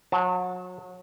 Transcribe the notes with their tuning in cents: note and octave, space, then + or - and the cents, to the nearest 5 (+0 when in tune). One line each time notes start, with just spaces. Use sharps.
F#3 -30 A5 +0